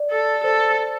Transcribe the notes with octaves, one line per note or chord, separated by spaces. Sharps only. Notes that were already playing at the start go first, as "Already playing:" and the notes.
Already playing: D5
A4
A4 C5